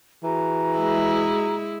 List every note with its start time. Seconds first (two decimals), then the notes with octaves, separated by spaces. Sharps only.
0.24 E3 F#4 G#4 A#5
0.77 G#3 E4